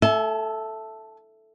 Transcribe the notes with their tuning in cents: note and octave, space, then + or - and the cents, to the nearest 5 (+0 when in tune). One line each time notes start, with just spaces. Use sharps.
A4 +0 E5 +0 G#5 +45